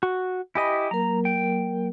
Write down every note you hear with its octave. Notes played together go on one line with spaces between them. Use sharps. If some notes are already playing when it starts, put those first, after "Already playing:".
F#4
E4 G4 D#5 G#5 B5
F#3 A#3 A#4 A#5
G5